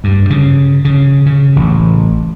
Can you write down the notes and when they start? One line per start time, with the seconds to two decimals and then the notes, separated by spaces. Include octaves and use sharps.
0.04 G2
0.30 C#3
0.85 C#3
1.26 C#3
1.56 A1